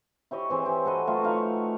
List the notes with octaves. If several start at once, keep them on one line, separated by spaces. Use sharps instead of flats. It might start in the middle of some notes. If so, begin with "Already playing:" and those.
E4 G4 C#5 D#5
E3 C4 G#4
G4
F#4 A4 B4 D#5
F#3 A3 F4
D#4 E4 F5 C#6